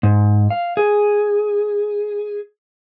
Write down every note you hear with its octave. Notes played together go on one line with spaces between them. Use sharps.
G#2
F5
G#4